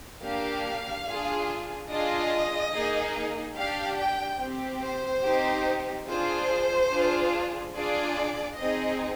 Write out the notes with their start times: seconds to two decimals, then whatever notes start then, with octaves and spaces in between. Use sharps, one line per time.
0.23 A#3 D4 G4 F5
1.06 D4 F4 G#4
1.89 D4 F4 G#4 D#5
2.73 A#3 D#4 G#4
3.56 D4 G4 F5
3.98 G5
4.40 C4 G4
4.82 C5
5.24 C4 D#4 G4
6.07 D4 F4 G#4 C5
6.91 D4 F4 G#4
7.75 D4 F4 G#4 D5
8.57 C4 D#4 G#4 D#5